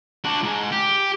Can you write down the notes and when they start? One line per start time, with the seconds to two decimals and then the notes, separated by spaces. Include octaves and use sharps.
0.24 D4 F#4
0.43 G#2 G#3
0.72 G4